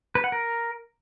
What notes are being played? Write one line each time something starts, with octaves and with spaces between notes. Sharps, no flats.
B4
F#5
A#4